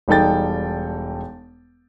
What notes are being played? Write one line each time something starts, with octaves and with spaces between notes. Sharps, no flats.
E1 G3 D#4 A4 G5 A6